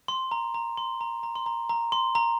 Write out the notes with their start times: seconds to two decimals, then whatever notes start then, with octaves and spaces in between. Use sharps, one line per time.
0.08 C6
0.31 A#5
0.54 A#5
0.77 C6
1.01 A#5
1.23 A#5
1.36 C6
1.46 A#5
1.69 A#5
1.92 C6
2.15 A#5